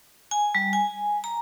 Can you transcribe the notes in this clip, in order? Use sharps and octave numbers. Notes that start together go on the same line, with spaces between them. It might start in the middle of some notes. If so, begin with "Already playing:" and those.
G#5
G3
G#5
A#5